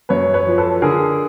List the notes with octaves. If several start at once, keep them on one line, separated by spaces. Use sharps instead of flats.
F#2 B4 C#5
B4 C#5
F3
A4 B4
D3 G#4 A#4